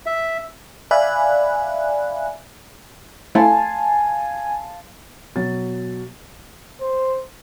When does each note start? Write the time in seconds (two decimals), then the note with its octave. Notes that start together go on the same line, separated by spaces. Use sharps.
0.06 E5
0.91 D5 E5 F5 G#5 B5 F#6
3.35 A3 E4 F5 G#5 A5 C6
5.36 B2 F#3 A6
6.81 C5